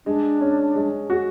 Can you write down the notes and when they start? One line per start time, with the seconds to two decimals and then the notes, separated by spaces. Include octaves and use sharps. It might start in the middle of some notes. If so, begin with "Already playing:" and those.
0.06 G#3 D4
0.41 C#4
0.75 G#3
1.10 F#4